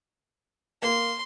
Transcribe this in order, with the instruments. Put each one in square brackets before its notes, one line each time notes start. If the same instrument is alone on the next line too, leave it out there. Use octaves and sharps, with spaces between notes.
[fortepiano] A#3 [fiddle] C6